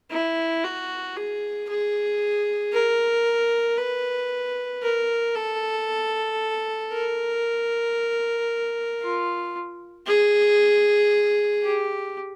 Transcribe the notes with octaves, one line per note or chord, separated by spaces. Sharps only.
E4
F#4
G#4
G#4
A#4
B4
A#4
A4
A#4
F4
G#4
G4